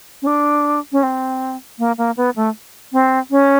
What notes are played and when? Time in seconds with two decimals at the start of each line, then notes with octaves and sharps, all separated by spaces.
0.22 C#4
0.27 D4
0.92 C#4
1.03 C4
1.79 A#3
1.98 A#3
2.17 B3
2.36 A3
2.93 C4
3.31 C#4